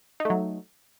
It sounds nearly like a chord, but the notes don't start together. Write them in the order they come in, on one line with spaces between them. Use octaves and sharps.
D#4 A3 F#3